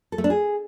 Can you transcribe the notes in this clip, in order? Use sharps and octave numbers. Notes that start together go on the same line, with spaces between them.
A4
A3
D4
G#4